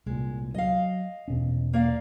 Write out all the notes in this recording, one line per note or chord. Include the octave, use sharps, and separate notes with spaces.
C2 A#2 G#3
F#3 D#5 F5
E2 B2 C#4
A#3 D5 F5